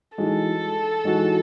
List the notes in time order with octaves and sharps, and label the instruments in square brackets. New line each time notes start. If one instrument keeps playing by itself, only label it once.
[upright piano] E3 G#3 D#4 F#4 [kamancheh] A4
[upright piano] E3 G#3 D#4 F#4